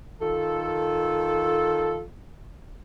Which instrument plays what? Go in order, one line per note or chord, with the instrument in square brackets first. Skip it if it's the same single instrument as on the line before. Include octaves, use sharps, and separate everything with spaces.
[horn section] D#3 F4 A4